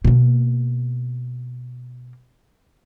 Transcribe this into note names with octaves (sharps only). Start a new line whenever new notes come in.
B2 A#3